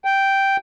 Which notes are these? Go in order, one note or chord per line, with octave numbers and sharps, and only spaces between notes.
G5